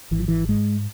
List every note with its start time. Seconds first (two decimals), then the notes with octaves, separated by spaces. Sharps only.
0.11 G#1 E3
0.19 F3
0.28 E3
0.48 G#2 G#3